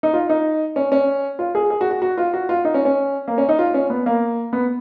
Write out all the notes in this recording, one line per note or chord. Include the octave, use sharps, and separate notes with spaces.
D#4
F4
D#4
C#4
C#4
F4
G#4
G#4
F#4
F#4
F#4
F4
F#4
F4
D#4
C#4
C#4
A#3
C#4
D#4
F4
C#4
B3
A#3
B3